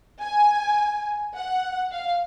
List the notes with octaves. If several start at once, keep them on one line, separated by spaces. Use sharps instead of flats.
G#5
F#5
F5